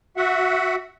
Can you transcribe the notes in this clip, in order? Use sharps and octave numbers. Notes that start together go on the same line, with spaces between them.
F#4 E5 F#5